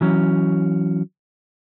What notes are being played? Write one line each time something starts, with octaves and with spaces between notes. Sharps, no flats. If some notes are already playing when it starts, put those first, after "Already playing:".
E3 F#3 C#4